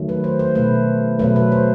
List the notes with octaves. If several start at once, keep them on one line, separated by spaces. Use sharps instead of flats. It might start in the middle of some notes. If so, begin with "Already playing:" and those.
Already playing: D#3 F#3 A3
B4
C5
C5
B2 A3 B4
B2 F#3 A3 B4
B4
C5